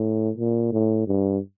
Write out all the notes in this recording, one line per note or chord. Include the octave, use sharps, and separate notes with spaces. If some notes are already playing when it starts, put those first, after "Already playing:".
Already playing: A2
A#2
A2
G2